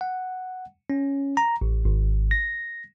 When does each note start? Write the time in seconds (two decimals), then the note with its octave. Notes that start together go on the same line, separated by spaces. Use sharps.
0.01 F#5
0.90 C#4
1.37 A#5
1.61 A1
1.85 G#1
2.31 A#6